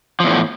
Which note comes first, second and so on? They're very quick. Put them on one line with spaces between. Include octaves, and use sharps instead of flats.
F3 E2 A2